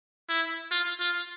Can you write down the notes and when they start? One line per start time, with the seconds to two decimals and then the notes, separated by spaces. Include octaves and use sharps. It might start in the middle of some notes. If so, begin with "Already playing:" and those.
0.29 E4
0.71 F4
1.01 F4